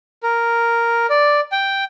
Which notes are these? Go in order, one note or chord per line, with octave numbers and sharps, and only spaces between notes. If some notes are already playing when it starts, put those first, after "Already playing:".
A#4
D5
G5